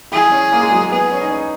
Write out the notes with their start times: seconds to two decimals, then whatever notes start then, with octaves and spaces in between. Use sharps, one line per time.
0.12 E4 G#4
0.32 C#4
0.52 A#3
0.62 G#3
0.72 F#3
0.82 G#3
0.92 B3 G#4
1.12 C#4
1.21 D#4
1.30 C#4
1.38 D#4